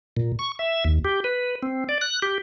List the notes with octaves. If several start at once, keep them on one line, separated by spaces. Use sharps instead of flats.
A#2
C#6
E5
D#2
G4
B4
C4
D5
F#6
G4